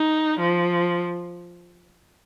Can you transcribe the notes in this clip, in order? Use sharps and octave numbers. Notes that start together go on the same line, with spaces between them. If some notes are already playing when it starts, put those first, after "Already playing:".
Already playing: D#4
F3